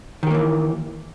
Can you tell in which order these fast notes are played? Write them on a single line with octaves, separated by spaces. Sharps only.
D#3 G4 A#3 E3